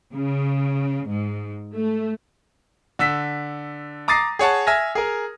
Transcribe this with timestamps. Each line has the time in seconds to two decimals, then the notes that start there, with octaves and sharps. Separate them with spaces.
0.13 C#3
1.07 G#2
1.74 A3
2.99 D3 E6 B6
4.08 A#5 D6 D#6 A6 A#6 C7
4.39 G#4 C#5 F#5 A5
4.67 E5 G#5 F6 G#6 A#6
4.95 G#4 A#4